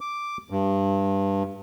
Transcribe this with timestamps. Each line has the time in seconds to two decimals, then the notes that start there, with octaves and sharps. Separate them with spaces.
0.01 D6
0.50 G2